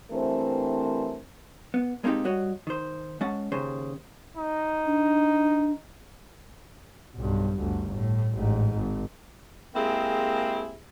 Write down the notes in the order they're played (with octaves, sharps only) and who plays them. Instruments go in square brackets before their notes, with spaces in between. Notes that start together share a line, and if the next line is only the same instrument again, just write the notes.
[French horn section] G2 E3 A3 C4 A#4 C5
[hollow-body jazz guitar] B3
G#3 A#3 C4 D#4 G4 A4
G2 G3 F#4 C#5 D#5 F#5
D#3 C5
G#3 C#4 F#5 A5
D#2 C#3 C5
[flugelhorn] D#4
[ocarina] D4
[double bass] B1 G2
G1 D2
A2
A1 G#2
G#1
[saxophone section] G#3 A#3 C4 E4 G4 G#4